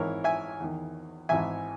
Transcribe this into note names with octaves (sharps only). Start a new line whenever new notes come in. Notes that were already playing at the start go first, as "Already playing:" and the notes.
Already playing: G#1 G#2 E3 A#4 C#5
E5 G#5
E2 D#3
G#1 G#2 E3 E5 G#5